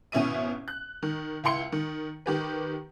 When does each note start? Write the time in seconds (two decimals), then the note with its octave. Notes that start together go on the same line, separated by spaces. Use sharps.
0.12 G#1 B2 C#4 E4 E5 D#7
0.68 F#6
1.02 D#3
1.44 C#2 E4 C6 C#7
1.72 D#3
2.26 D#3 G4 B4